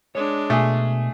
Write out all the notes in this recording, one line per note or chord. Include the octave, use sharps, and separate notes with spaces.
G#3 D4 C#5
B2 A3 G#4